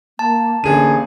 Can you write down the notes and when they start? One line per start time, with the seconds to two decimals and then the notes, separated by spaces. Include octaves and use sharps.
0.19 A#3 A5
0.64 A1 D3 A#3 G#4 D#7